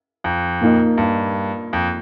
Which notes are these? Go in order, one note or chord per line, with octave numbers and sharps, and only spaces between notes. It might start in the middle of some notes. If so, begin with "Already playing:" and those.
F2
A#2 A#3 D#4
G2
F2